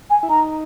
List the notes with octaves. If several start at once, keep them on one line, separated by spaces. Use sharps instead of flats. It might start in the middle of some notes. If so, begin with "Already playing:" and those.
G#5
E4
D#4 A#5